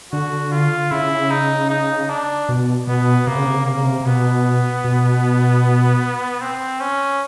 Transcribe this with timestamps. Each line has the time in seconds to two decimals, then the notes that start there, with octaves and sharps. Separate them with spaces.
0.12 D3 F#4
0.52 F4
0.91 C#3 E4
1.30 D#4
1.70 D#4
2.09 D4
2.49 B2
2.87 B2 B3
3.27 C3 A#3
3.37 C#3
3.46 C3
3.55 C#3
3.65 C3 A#3
3.75 C#3
3.84 C3
4.01 C3
4.06 B2 B3
4.84 B2
6.41 C4
6.81 C#4